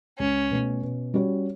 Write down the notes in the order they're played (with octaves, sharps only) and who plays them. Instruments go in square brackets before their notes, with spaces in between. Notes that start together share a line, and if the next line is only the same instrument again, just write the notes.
[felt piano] C#2 [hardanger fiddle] C#4
[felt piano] B2 A3
B2
G3 C#4 F#4 C#5